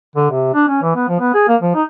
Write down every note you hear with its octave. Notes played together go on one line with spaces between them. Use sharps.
D3
C3
D4
C#4
E3
B3
F3
B3
G#4
A#3
F3
D#4